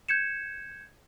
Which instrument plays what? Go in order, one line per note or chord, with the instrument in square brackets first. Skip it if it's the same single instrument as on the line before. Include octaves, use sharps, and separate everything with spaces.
[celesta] G6 G#6 C#7 E7